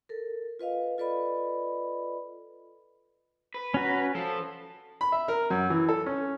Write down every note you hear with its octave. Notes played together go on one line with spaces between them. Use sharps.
A4 A#4
F4 B4 D#5 F5
F4 A4 B4 D5 D#5 B5
B4
C#4 F#4 A#5
F3 A4
B5
E5
A#4
F#2
E3
A4
C#4